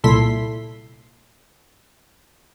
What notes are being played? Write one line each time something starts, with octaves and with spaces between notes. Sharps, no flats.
C2 A#2 E4 A4 C6 B6